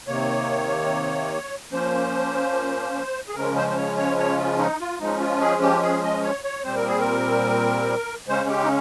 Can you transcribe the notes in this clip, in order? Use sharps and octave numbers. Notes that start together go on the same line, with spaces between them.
C3 D#3 A#3 C#5
F3 A#3 C#4 C5
G#4
C#3 F3 G#3 C#4 A#4
C5
C5
C#5
C#5
C#5
F4
D#4
F4
F3 G#3 C#4 D#4
F4
G#4
G4
G#4
D#5
C#5
C#5
A#2 G3 C4 C5
A#4
G#4
A#4
C#3 G#3 C#4 C5
G4
D#4